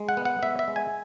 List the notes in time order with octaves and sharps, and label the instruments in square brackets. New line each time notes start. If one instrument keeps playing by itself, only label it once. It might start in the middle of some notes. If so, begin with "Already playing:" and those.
Already playing: [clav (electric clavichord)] G#3
F#5
B3
F#5
B3 E5
E5
G#3
G#5